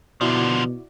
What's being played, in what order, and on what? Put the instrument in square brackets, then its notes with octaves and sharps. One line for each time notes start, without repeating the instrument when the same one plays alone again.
[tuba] B2 [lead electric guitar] D3 F3 [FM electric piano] E4 F#4 D5